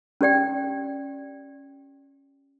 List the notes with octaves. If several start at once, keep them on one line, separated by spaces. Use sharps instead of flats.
C#4 G4 D5 G5